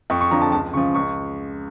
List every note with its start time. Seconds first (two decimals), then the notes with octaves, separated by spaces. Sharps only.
0.10 F2 C#6
0.21 C#6
0.31 D3 F3 A#5
0.42 A5
0.52 C#2 A5
0.73 C#3 F3 C#6
0.95 C#2 C#6